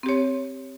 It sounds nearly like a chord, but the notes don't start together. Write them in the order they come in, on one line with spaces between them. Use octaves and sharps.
C4 G4 C#5